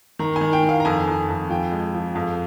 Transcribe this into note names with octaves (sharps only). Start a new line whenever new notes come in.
D#3 A#5
G#5
D#3
G5
D#3
F5
A#5
F2 G#5
F2
F2
F3 G5
G#3
F3
F2 F5